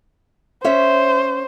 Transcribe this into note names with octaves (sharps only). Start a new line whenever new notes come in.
C#4 C5 C#5 E5